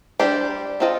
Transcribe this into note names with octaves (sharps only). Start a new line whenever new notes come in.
G3 D4 G4 C5
C4 F4 A4 D#5